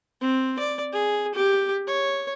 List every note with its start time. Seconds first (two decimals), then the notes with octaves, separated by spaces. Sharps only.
0.21 C4
0.59 D5
0.92 G#4
1.35 G4
1.87 C#5